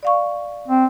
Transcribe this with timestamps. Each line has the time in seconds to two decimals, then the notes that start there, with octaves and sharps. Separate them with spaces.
0.03 D5 F5 C#6
0.68 C4